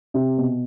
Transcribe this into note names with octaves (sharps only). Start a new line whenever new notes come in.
C3
B2